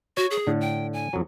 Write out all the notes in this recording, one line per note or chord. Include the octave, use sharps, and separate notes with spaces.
F#4 C#5
G#4
A2 D3
G5
G#5
F2 F#3